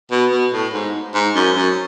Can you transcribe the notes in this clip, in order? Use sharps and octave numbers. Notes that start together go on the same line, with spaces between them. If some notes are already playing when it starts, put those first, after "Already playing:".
B2
B2
A2
G#2
G#2
F#2
F#2